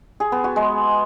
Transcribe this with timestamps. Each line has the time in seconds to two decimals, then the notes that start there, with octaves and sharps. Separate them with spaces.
0.20 G#4
0.32 B3
0.44 F#4
0.56 G#3